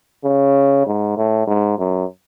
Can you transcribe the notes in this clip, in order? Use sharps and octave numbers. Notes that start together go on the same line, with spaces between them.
C#3
G#2
A2
G#2
F#2